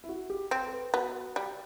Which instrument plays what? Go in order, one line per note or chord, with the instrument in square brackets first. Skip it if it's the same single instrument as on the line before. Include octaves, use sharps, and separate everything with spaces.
[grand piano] E4
F#4
G4
[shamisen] C4 [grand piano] C5
[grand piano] B4
A4
B4
[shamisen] B3 [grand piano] F#4
[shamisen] G3